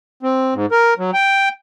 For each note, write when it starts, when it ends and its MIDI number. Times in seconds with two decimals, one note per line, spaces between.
0.23 0.54 60
0.54 0.66 44
0.72 0.94 70
0.98 1.11 54
1.14 1.49 79